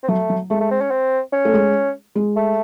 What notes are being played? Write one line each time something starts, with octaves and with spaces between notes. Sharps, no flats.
C4
F#3 A3
F#3
G#3 A3
A3
C4
C#4
C4
C#4
A3
G#3
G#3
A3